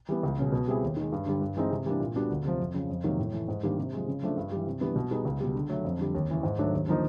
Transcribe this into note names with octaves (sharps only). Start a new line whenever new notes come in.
E3 G3 B3
C#2
B2 G#3 C#4
B2
G3 C4 E4 G#4
D#2
D#3 G#3
G2
D3 G3
G2
E3 G#3 C4 D#4
C3
E3 G3 A#3 D4
A#2
G3 B3 D4 F#4
D2
C3 F3
F2
C#3 F3
F2
C3 D#3 F#3 A#3
A2
E3 A3
G#2
D#3 G3 A#3 D4
C3
F3 G#3
C#3
F3 A3 D4
G2
G3
E3
C3
E3 G3 B3 D4
B2
G3 B3 D#4 G#4
C#2
B2 G3
D3
F#3 A3
F2
D3 G3
D#2
C#3 E3
G#2
D#3 F#3 A3 D4
D#2
D3 F3 A#3 D#4